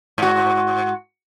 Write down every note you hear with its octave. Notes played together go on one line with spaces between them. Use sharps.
G#2 F#4